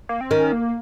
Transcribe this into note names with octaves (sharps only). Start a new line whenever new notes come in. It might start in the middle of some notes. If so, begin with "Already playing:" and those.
A#3
C4
D#3 C#4
A#3